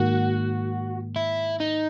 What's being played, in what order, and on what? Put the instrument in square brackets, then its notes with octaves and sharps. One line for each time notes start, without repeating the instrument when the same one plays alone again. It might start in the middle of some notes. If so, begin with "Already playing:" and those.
Already playing: [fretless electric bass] G#2 D#3 A#3 [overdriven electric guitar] F#4
[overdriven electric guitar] E4
D#4